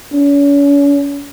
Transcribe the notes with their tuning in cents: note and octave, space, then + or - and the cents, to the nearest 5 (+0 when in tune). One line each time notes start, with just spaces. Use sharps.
C#4 +40